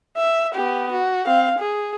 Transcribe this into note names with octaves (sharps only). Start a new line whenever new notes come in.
E5
B3 G4
F#4
C4 F5
G#4